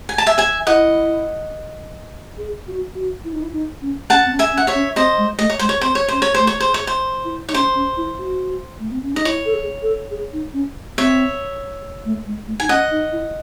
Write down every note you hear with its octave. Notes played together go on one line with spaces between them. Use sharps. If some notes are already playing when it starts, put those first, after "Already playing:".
G#5
A5
E5 G#5
E5 G#5
E4 D#5 F#5
G#4
F#4
F#4
E4
D#4
E4
D#4
C#4
C#4 F#5 A5
C4
C#4
E5 G#5
C#4
F#5
C#5 E5
C#4
C4 C5 D#5
G#3
A3 D#5
C#5
G#3 C5
C#5
C4 C5
C#5
C#4 C5
C#5
A3 C5
C#5
C5
G#4
C#5
C5
E4
D#4 C#5
C#4 C5
C#4
E4
F#4
A3
C4
C#4
D#4 D#5
E4 C#5
A4
G#4
A4
G#4
D#4
C#4
C4 C#5 E5
A3
G#3
A3
D#4 G#5
C#4 D#5 F#5
D#4
E4